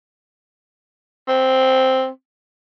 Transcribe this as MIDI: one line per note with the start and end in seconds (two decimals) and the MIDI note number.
1.28 2.08 60